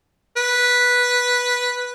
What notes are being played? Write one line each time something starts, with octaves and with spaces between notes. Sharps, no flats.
B4